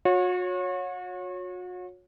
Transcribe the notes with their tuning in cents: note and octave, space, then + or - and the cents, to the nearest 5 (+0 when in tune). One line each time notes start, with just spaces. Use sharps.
F#4 -40 C#5 -5